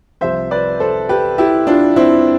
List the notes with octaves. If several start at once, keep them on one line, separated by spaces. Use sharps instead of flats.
C2 C3 F3 C5 E5
B4 D5
A4 C5
G4 B4
E4 G4
D4 F4
C4 E4